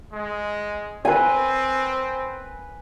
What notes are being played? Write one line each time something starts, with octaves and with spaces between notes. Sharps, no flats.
G#3
C4 B4 G#5